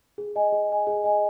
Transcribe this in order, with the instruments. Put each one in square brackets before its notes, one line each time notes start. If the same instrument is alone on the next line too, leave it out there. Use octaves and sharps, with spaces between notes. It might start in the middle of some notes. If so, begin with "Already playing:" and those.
[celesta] G#4
D#5 G#5
G#4
D#5 G#5
G#4
D#5 G#5